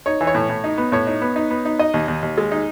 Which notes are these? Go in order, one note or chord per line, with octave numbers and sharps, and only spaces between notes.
D#4 C#5
E3
C#5
A2
A2
D#4
B3
A2 C#5
D#4
B3
D#4
B3
D#4
D#4 D#5
D#2
D#2
D#2
G#3
D#4